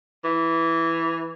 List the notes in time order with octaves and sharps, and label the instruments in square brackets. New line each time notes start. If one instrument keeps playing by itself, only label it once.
[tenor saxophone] E3